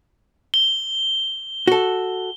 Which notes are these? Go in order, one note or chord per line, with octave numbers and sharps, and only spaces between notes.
G7
F#4 A4